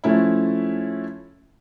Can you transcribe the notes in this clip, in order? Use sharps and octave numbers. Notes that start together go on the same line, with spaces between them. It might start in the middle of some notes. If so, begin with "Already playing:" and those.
F3 A3 C#4 E4